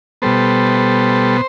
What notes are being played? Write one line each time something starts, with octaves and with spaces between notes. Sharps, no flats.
B2 G3 B3 A4 C5